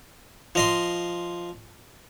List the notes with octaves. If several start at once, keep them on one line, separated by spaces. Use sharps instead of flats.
F3 D#5 C6